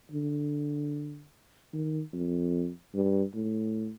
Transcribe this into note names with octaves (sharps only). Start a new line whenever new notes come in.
D3
D#3
F2
G2
A2